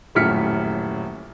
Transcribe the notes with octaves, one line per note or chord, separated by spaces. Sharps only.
D#1 F#2 A2 F6 B6 C#7